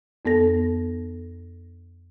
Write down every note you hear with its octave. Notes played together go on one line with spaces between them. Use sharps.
F2 B3 A4 A#6